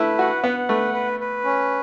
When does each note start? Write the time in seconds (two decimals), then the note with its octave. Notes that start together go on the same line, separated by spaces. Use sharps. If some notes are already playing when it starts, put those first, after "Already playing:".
Already playing: A3 E4 B4
0.19 F#4 F#5
0.44 B3 F#5
0.68 A3 B4
0.94 B4
1.20 B4
1.44 C#4